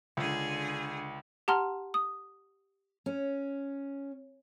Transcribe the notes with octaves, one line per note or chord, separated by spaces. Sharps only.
C#2 D3 G#4
G4 F#5 A5 A#5 C6 F6
D#6
C#4